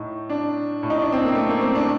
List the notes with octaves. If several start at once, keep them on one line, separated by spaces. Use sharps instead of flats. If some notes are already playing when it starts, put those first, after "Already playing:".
Already playing: A2 D#4
D4
A2
D#4
D4
C4
A#3
A3
A#3
C4
D4